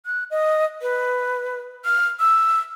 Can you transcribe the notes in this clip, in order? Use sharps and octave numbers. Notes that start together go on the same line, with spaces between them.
F#6
D#5
B4
F6
E6